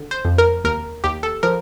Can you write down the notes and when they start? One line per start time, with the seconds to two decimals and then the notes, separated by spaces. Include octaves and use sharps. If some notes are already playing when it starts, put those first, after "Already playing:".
Already playing: D3
0.11 C5
0.25 F2
0.38 A#4
0.64 D#2 A#4
1.04 D#2 G4
1.23 A4
1.43 F3 A#4